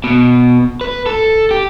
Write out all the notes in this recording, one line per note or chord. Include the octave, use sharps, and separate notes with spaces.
B2
B4
A4
G4